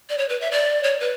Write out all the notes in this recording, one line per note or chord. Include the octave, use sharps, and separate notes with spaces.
D5
C#5
B4
E5
D5
C#5
B4